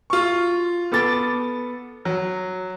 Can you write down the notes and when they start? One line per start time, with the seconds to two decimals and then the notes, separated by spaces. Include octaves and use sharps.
0.10 F4 C#6
0.92 B3 A4 D6 A6
2.05 F#3